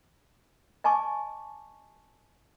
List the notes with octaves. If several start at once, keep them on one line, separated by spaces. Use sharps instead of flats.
D#5 G#5 A5 C#6 D6